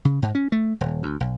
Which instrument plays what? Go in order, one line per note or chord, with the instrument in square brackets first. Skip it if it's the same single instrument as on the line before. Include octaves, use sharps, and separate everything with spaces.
[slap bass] C#3
G#2
C#4
A3
D#1
D2
B1